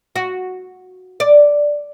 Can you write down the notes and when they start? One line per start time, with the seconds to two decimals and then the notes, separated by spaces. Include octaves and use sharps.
0.16 F#4
1.20 D5